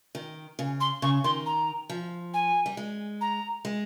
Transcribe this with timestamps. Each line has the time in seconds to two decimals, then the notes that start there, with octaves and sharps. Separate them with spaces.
0.15 D#3
0.59 C#3
0.80 C6
1.02 C#3 C#6
1.24 D#3 C6
1.46 A#5
1.89 F3
2.34 G#5
2.66 G3
2.77 G#3
3.21 A#5
3.65 G#3